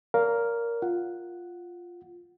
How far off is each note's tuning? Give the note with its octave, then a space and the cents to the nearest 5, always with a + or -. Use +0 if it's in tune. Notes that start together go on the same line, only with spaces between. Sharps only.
A#4 +0 D5 -45 F5 +0
F4 +0 F#5 +0